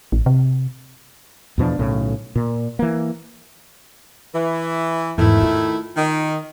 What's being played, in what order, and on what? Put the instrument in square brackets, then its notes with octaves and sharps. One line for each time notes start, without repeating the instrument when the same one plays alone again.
[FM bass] A1
C3
[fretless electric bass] E2 B2 F3 D4
B1 A2 C#3
A#2
E3 A#3
[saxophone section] E3
[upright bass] E2 G#2 [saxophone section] D#3 A3 E4
[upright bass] F4
[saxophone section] D#3